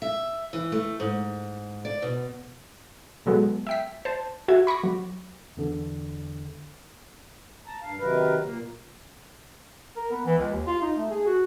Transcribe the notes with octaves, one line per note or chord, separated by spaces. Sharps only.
E5
E3
A3
G#2
D5
B2
B2 F#3 G#3 B3 A4
E5 G5 B6
C5 A5
F#4 E5 G#6
B5 C#6 D6 A#6
F#3
E2 D3
A5 A#5
G2 F5
C3 D#3 F#3 A#4 B4
A#2 A#3
A#4
B3
E3
C#2
D#2
F4
D#4
A3
G#4
F#4